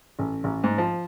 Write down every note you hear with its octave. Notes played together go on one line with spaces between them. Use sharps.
A1
A1
G#2
F3